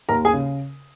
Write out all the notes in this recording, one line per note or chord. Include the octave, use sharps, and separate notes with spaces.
D#2 A#4 A#5
G#4 G#5
C#3